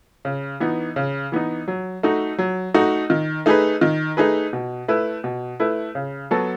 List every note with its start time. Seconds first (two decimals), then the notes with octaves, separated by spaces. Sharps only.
0.25 C#3
0.60 E3 B3 D#4
0.96 C#3
1.32 E3 B3 D#4
1.68 F#3
2.03 A3 D#4 F#4
2.39 F#3
2.74 A3 D#4 F#4
3.10 D#3
3.46 A3 D#4 G#4 B4
3.81 D#3
4.17 A3 D#4 G#4 B4
4.53 B2
4.88 A3 E4 B4
5.24 B2
5.60 A3 E4 B4
5.95 C#3
6.31 F#3 B3 F#4 A4